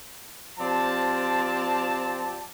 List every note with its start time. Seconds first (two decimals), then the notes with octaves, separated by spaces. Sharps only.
0.59 C3 F3 C4 D5 A5